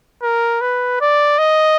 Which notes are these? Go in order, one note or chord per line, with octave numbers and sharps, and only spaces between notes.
A#4
B4
D5
D#5